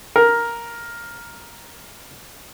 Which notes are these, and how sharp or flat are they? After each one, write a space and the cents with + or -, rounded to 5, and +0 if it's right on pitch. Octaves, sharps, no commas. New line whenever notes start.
A#4 +5